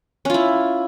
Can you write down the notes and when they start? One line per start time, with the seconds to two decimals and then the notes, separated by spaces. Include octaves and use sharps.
0.25 C#4
0.30 F4
0.34 E4